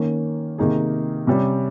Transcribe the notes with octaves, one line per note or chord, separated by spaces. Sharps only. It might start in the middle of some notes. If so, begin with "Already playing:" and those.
Already playing: D#3 A#3 C#4
C3 D#3 A#3 D#4 G#4
C3 G3 C#4